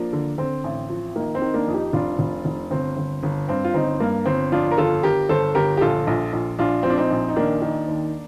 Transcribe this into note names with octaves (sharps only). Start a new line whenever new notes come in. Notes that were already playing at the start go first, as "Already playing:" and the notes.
Already playing: F3 A#3 D4
D3
D3 C4
A1
F3
D#3 A#3
C4
D#3
A#3 D4
F2
D#4 G4
F1 D4 F4
F1
F1
G1 C4
G1
G1
G2 C4
F4
G1 C4 D#4
G2 A#3
G1 C4
F2 D4 F4
A#4
G1 F4 A4
G1 G4 A#4
G1 A4 C5
G1 G4 A#4
G4
A#1 F4 A4
A#1
A#1
A#1 D4 F4
F3 C4
D4
C4 D#4
A#1
D#4
D#3 A#3 D4
D#3
D#2